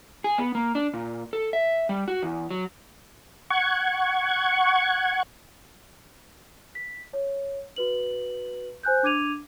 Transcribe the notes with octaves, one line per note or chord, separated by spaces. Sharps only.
G#4
B3
A#3
D4
A#2
A4
E5
G3
F#4
E2
F#3
F#5 C#6 G#6
B6
C#5
F#4 B4 F#7
C5 G#5 F#6 G6
D4 D6 G#6 D#7 F7